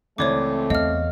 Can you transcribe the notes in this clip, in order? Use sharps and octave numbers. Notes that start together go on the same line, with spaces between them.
C#2 E3 A3 C4 C#5 D5 D6 G#6
E2 D#5 F5 F6